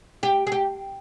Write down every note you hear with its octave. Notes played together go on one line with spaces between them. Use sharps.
G4
G#4
G4